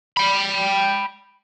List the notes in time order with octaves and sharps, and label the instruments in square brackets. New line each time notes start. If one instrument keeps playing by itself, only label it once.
[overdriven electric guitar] G5 B5